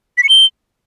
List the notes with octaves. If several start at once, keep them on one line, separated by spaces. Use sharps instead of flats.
B6
C#7
G7